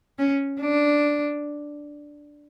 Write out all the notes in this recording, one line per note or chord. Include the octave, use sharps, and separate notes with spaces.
C#4
D4